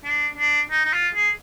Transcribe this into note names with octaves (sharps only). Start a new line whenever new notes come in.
D4
D4
D#4
D#4
F4
G#4